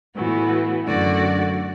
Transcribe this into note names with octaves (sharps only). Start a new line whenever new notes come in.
A2 E3 B3 F#4
F#2 D3 A3 F#4 D5